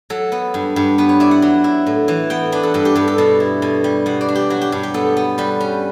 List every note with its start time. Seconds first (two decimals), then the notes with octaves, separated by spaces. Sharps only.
0.10 F#3 A4
0.32 B3
0.54 G2
0.76 G2
0.98 B3 B4
1.09 C#5
1.20 E4 D5
1.31 F#5
1.42 F#3
1.64 E4
1.86 A2
2.08 E3
2.30 B3 G5
2.52 D4 B4
2.63 A4
2.74 G2 A4
2.85 G4
2.95 G2 A4
3.08 A4
3.18 B2 A4
3.40 E4
3.62 B2
3.84 G3
4.06 B2 F#5
4.21 D5
4.28 D4
4.35 G4
4.50 F#3 F#4
4.61 G4
4.72 G2
4.83 G4
4.94 B3 A4
5.17 B3
5.38 G3 B4
5.60 C#4